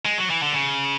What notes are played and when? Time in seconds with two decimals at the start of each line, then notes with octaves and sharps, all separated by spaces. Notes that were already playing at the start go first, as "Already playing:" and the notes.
0.05 G#3
0.18 F#3
0.30 E3
0.42 D3
0.54 C#3